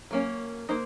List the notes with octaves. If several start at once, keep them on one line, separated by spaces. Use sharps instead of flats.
F#3 A#3 C#4
A#3 D#4 C5